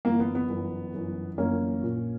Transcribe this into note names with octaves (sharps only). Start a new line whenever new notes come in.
G1 F#2 E3 A#3
B3
B3
G1 F#2 E3
G1 F#2 E3
G1 F#2 E3 A#3 C#4
A#1 A#2